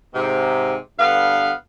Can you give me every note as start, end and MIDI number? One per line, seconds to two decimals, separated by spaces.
0.14 0.75 44
0.14 0.75 48
0.99 1.52 43
0.99 1.52 50
0.99 1.52 59
0.99 1.52 77